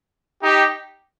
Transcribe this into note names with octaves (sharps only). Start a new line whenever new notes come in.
D#4 G4